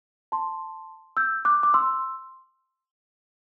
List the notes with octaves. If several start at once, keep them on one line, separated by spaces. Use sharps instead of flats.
A5 C6
E6 G6
D6 F#6
D6
C6 E6